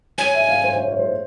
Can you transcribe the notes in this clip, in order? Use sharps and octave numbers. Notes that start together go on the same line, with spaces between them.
C#5 G#5
E5
F5
C5
C#5
C#5
C5